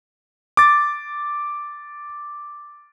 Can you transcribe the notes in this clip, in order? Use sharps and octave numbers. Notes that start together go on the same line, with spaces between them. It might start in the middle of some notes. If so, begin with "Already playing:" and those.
D6 A6